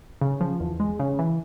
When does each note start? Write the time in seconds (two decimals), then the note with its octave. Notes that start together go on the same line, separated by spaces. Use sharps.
0.21 C#3
0.41 F3
0.60 E2
0.80 G#3
0.99 C#3
1.19 E3